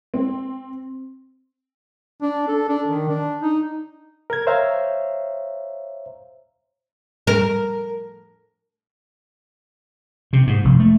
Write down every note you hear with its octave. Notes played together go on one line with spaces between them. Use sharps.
C4
D4
A4
D4
D#3
D4
D#4
A#4 G#6
C5 C#5 E5 F5 A#5
A#4
C3
G#2
F1
A3